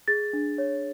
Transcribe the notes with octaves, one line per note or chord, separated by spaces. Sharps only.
G#4 A6
D4
C#5